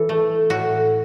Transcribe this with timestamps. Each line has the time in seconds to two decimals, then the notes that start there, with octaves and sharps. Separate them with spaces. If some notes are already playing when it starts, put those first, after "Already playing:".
Already playing: E3 A4
0.09 A3
0.50 A2 F#4